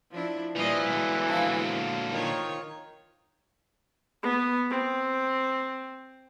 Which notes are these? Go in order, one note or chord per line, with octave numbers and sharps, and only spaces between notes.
F3 D4 E4
A#2 E3 F3 G3 D#5
E2 A#2 D3 F#3 G#3
F3
D#3 F4 C#5
B3
C4